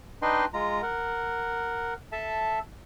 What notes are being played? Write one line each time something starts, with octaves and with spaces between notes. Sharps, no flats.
D4 D#4 B4 D#5 G5 C6
G#3 F4 A#5
A#4 F#5
A4 E5 A5